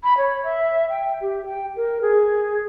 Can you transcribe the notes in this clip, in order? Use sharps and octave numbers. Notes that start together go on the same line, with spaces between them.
B5
C#5
E5
G5
G4
G5
A#4
G#4